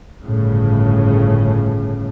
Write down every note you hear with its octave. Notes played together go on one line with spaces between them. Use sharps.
G1 A2 C#3